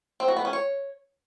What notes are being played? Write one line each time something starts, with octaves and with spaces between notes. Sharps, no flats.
C4
F#4
B3
C#4
C#5